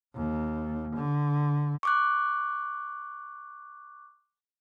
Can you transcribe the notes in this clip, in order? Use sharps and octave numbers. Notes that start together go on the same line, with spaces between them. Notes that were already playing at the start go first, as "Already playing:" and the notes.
D#2
D3
C#6 D6 F#6